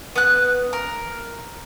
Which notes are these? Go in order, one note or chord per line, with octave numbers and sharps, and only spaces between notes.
B3 F#6
A#4